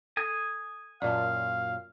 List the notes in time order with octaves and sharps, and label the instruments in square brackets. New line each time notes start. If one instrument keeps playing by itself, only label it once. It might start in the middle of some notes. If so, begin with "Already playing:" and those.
[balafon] A4 [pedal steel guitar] G#5 D#6
[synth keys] F#2 A#2 [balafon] D5 D#5 A5 [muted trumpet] F5